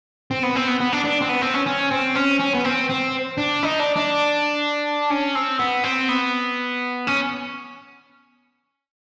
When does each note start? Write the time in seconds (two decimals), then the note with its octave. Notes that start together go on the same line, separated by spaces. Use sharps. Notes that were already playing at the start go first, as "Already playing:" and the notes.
0.31 C4
0.43 B3
0.55 C4
0.67 B3
0.80 B3
0.93 D4
1.05 D4
1.22 C4
1.29 B3
1.42 C4
1.54 C#4
1.66 C#4
1.91 C4
2.15 C#4
2.39 C#4
2.54 B3
2.64 C4
2.90 C4
3.38 D4
3.63 D#4
3.79 D4
3.96 D4
5.10 C#4
5.35 C4
5.59 B3
5.84 C4
6.09 B3
7.07 C#4